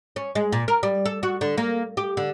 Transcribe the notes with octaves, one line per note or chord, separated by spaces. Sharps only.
C#4
G#3
A#2
A#4
G3
A4
F#4
D3
A#3
G4
D3